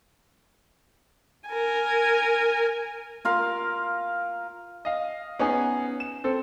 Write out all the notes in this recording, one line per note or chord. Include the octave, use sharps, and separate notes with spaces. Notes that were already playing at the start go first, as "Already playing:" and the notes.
A#4 G#5
F4 A#4 F5
D#5 F5
B3 C#4 D#4 G#4
E7
C4 A4